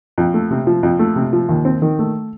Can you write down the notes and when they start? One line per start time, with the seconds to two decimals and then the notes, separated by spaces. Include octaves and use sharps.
0.18 F2
0.34 A3
0.51 C3
0.67 F3
0.83 F2
0.99 A3
1.16 C3
1.33 F3
1.49 D#2
1.65 C4
1.82 D#3
1.99 A3